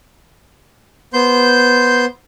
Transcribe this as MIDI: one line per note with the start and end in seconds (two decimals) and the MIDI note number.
1.14 2.06 59
1.14 2.06 72
1.14 2.06 84
1.14 2.06 91